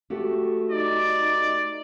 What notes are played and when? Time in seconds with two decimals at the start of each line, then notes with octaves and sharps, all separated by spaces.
0.10 A3 F#4 G4
0.71 D#4 D5